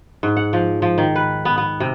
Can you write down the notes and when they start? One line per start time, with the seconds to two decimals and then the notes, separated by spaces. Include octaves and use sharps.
0.23 G#2
0.37 F#5
0.53 F3
0.82 F3
0.98 D#3
1.16 B4
1.45 B3
1.58 B3
1.80 C3